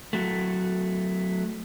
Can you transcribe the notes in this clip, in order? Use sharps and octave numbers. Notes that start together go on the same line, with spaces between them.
F#3 A3